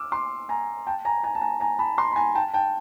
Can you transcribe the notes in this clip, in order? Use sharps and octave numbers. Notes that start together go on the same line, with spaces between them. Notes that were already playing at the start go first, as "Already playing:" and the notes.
Already playing: D6 E6 F6
C6 D6
G#5 A#5
G5 A5
G#5 A#5
G#5 A#5
A5
G#5 A#5
G#5 A#5
A5 B5
A#5 C6
B5
G#5 A#5
G5 A5
G5 A5